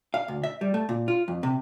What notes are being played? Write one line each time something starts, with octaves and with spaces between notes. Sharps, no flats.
F5
D2
E5
G3
A3
A#2
F4
F2
C3